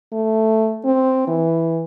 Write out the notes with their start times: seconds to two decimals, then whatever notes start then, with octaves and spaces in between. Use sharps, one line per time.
0.12 A3
0.84 C4
1.28 E3